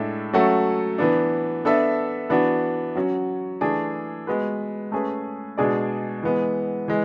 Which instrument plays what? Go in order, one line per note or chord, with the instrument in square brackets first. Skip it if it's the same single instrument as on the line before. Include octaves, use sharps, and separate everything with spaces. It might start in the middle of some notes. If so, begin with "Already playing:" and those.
Already playing: [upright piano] A2 G#3 D4 A4 E5
F#3 A3 C#4 F#4 A4
E3 B3 D4
B3 D4 A4 E5
E3 B3 D4 F#4
F#3 C#4 F#4
E3 A3 D4 G#4
G#3 B3 F#4 B4
A3 C#4 G#4 B4
B2 G#3 D4 G#4 D5
E3 G#3 B3
E3 G#3